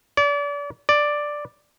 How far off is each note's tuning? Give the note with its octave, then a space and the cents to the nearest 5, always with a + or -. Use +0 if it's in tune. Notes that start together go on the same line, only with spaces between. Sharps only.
D5 -35
D5 +5